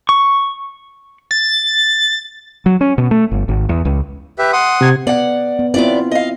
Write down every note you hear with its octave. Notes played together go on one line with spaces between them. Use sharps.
C#6
A6
F#3
C#4
B2
A3
G1
G#1
E2
C#2
G4 B4 E5
F#5 C6 D#6
C3 G#6
B3 D5 F#5
B3
D#2 B3 C4 E4 F4 D5
D#5 F5